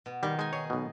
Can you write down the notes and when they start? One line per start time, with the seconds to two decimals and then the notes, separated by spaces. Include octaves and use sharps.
0.06 B2
0.23 D#3 G3
0.39 G#3 D#4 G#5
0.53 G#4 C#5
0.70 B1 B2